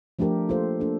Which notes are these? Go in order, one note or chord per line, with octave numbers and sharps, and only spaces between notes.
F3 A3 D4 G4 A#4
A#3 F4 A4 C5
A#3 D4 A4